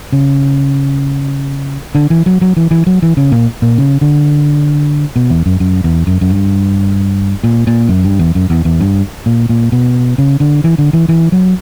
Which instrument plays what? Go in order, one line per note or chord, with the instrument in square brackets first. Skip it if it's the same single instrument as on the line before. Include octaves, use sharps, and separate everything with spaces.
[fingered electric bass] C#3
D3
E3
F#3
F#3
E3
E3
F#3
E3
C#3
A#2
A#2
C#3
D3
B2
E2
F#2
F#2
E2
F#2
F#2
G2
A#2
A#2
F#2
G2
E2
F#2
E2
E2
G2
A#2
A#2
B2
C#3
D3
E3
D3
E3
E3
F#3